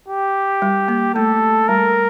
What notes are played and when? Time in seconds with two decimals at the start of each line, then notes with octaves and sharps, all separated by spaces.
0.08 G4
0.62 G3
0.88 A#3
1.15 A3 A4
1.68 G3 A#4